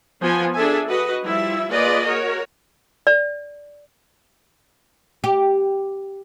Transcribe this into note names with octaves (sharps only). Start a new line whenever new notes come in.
F3 B3 G#5
D4 G#4 A4 E5 G#5
F#4 B4 D#5
F3 G3 E4 E5
A#3 F4 G#4 B4 D5 D#5
F#4 A#4 C#5
D5
G4